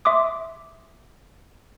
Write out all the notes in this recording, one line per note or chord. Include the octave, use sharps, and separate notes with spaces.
E5 C6 D6 D#6